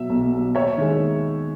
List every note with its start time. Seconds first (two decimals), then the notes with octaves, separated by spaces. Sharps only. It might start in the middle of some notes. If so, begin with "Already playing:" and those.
Already playing: B2 F#3 E5
0.10 B1
0.32 B2 F#3
0.55 D#2 C#5 E5
0.78 D#3 G#3